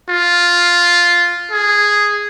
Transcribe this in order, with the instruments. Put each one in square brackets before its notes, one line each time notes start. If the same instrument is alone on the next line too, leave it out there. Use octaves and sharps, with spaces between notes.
[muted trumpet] F4
G#4